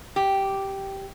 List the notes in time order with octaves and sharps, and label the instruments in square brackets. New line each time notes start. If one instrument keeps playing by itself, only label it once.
[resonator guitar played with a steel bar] G4